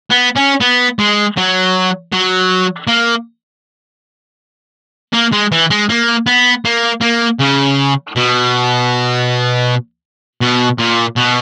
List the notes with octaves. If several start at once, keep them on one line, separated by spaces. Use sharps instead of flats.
B3
C#4
B3
G#3
F#3
F#3
A#3
A#3
G#3
E3
G#3
A#3
B3
A#3
A#3
C#3
B2
B2
A#2
B2